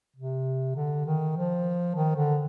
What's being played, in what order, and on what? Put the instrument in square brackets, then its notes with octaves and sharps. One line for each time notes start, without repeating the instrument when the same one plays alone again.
[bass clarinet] C3
D3
D#3
F3
D#3
D3